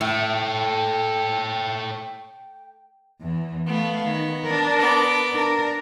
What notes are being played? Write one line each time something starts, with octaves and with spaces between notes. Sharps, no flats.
A2 A4 C#5 G5
E2 E3
A3 B3 F5
D#3
D4 A#4
B3 D6
D4 A#4